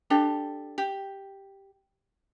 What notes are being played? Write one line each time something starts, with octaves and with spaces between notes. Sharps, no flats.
D4 G4 A4
G4